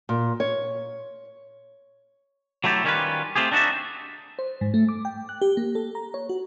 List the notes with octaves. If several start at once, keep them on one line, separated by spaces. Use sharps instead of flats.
A#2
C#5
F#3 A3 E4 G4 A4
D#3 G3 C#4 E4 F4 B4
A3 C4 F4 G4 G#4
D4 D#4 F#4 A#4 D5 E5
C5
G#2
A3
D6
G5
F#6
G4
A#3
A4
A#5
C#5
F#4